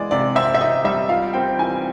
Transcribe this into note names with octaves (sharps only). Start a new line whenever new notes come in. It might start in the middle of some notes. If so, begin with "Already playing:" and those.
Already playing: E3 G#3 D5
C3 D5
C4 E5
E5
D#4 D#5
G3 E5
F4 F5
C4 G5
E3 G#5